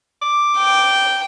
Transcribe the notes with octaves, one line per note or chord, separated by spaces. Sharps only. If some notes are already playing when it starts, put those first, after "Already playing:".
D6
G5